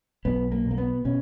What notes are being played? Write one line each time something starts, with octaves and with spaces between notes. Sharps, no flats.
B1 B3
A#3
B2
A#3
B3
B2 C#4